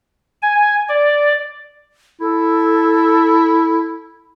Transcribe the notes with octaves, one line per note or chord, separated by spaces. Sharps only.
G#5
D5
E4 A4